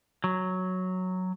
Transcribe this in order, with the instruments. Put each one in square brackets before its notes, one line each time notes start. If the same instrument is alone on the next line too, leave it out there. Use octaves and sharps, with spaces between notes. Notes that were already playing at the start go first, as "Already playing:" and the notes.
[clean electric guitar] F#3